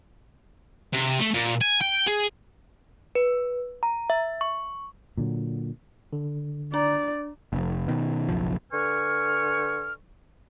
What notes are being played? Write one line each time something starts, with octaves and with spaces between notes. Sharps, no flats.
C3
A3
A#2
G#5
G5
G#4
B4
A#5
E5
C#6
A#2 D3 F#3
D3
D4 D5 A#5
F1
B2 D#3
F#1 B1 F3
D3 B4 G#5 C#6 F6